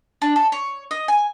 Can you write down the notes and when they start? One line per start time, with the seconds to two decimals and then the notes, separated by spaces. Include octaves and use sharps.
0.22 D4
0.36 A4
0.52 C#5
0.91 D#5
1.08 G#5